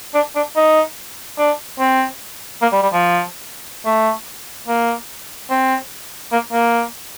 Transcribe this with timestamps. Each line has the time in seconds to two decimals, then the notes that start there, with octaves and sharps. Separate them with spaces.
0.14 D4
0.35 D4
0.56 D#4
1.38 D4
1.80 C4
2.62 A#3
2.73 G3
2.83 G3
2.93 F3
3.85 A3
4.68 A#3
5.50 C4
6.32 A#3
6.52 A#3